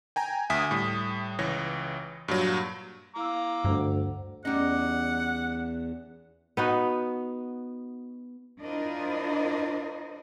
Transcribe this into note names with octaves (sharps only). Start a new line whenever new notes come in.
G5 G#5 A#5
D2 E5 G#5 D#6 B6
A2 G3
C#2 E3 C#5 A#6
G2 A#2 F#3
E4 F5 A#5 D6 E6
D2 G2 C5 F#5
E2 G3 A3 C#4 D#4 F#5
B3 D#4 F#4
D4 E4 F4 A#4 C5 D#5